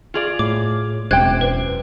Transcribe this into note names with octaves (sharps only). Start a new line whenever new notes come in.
F4 G#4 D5
A2 D6
E1 F#2 C4 C5 D5 G5 F#6 G#6
B4